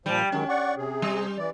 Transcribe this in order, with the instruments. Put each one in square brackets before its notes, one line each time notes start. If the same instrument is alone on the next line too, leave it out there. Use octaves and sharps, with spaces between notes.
[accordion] A#2 F3 [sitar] G3 G4
[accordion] D#3 F#3 G#3 [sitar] C#4
[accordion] D5 F#5 C#6
C3 G#4
[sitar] G3
[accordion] E3 D5